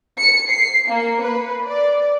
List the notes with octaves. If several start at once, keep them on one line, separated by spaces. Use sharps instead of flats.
C#7
C7
A#3
B4
D5